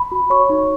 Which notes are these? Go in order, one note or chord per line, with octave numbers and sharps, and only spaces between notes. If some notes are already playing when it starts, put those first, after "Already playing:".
Already playing: B5
F#4
C#5 C#6
D#4